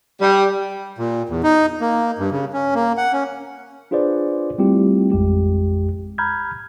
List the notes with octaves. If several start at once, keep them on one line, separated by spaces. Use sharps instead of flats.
G3
A#2
E2
D#4
A#3
G2
C#3
C#4
A#3
F#5
C#4
D4 F4 G#4 B4 C5 D5
G3 A3 C4 E4 F4 G4
A1 F2 G#3 G4
A#5 B5 F6 G6 G#6